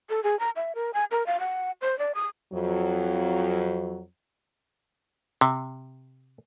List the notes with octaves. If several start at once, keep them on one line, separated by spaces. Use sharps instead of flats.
A4
G#4
A#5
E5
A#4
G#5
A#4
F5
F#5
C5
D5
D#6
F2 F#3
C3